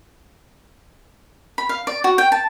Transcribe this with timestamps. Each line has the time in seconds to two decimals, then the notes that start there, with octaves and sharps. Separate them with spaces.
1.58 B5
1.69 F5
1.87 D5
2.04 F#4
2.18 G5
2.32 A5